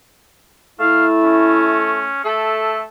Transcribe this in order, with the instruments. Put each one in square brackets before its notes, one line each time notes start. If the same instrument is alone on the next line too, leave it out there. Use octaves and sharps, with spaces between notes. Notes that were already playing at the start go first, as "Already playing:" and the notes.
[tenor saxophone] A3 [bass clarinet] E4 [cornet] F5
[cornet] C#4
[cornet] A3 [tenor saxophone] A4